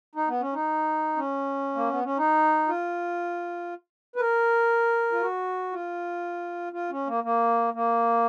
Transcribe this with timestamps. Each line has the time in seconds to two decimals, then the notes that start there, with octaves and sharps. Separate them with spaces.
0.15 D#4
0.28 B3
0.41 C#4
0.53 D#4
1.16 C#4
1.75 A#3
1.90 B3
2.04 C#4
2.17 D#4
2.68 F4
4.16 B4
4.20 A#4
5.12 F4
5.21 F#4
5.72 F4
6.73 F4
6.91 C#4
7.07 A#3
7.24 A#3
7.74 A#3